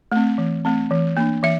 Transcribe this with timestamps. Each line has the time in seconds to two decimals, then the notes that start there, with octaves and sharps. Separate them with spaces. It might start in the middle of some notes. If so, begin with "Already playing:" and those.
0.12 A3 C4
0.38 E3
0.65 A3 C4
0.91 E3
1.17 A#3 D4
1.43 E3 E5